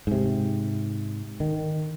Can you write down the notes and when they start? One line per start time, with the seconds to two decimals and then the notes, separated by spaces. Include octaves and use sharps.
0.07 G#2 C3
1.40 D#3